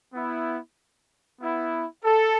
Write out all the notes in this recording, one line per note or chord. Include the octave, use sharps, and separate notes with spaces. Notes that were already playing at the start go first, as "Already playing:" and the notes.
B3 E4
B3 E4
A4